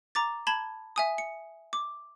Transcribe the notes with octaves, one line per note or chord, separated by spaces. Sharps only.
A#5 D6 A6
A5 B5 G#6 F#7 G7
E5 G#5 D#6
C#7
D6